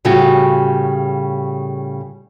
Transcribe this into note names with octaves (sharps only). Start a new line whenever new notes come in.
A2 C#3 G3 C#4 F4 F#4